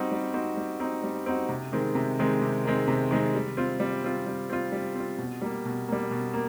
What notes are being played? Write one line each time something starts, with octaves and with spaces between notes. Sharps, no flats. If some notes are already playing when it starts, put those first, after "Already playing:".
Already playing: G3 C4 D#4 F#4
G3
C4 D#4 F#4
G3
C4 D#4 F#4
G3
C4 D#4 F#4
C3
D#3 G#3 C4
C3
D#3 G#3 C4
C3
D#3 G#3 C4
C3
D#3 G#3 C4
G3
C4 F4
G3
C4 F4
G3
C4 F4
G3
C4 F4
B2
G3 A#3
B2
G3 A#3
B2
A#3